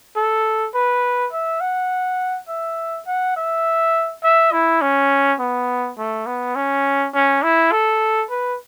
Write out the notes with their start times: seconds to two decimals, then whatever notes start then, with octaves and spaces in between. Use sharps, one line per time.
0.16 A4
0.75 B4
1.32 E5
1.61 F#5
2.48 E5
3.07 F#5
3.36 E5
4.24 E5
4.52 E4
4.82 C#4
5.39 B3
5.98 A3
6.26 B3
6.56 C#4
7.15 C#4
7.43 E4
7.72 A4
8.30 B4